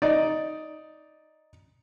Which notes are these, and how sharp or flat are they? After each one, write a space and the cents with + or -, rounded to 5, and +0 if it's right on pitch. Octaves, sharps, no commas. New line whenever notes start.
D#4 +5 D5 +0